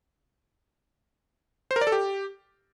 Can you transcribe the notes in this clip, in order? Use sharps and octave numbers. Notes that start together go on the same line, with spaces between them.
C5
A#4
D5
A4
G4